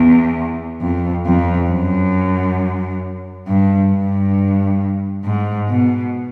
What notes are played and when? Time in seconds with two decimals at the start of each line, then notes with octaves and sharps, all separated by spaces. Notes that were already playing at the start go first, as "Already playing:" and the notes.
Already playing: E2
0.81 F2
1.26 F2
1.70 F#2
3.47 G2
3.92 G2
5.24 G#2
5.69 B2